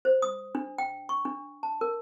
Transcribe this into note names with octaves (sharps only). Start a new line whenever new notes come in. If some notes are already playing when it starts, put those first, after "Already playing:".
C5
D#6
D4
G5
C#6
D4
A5
A#4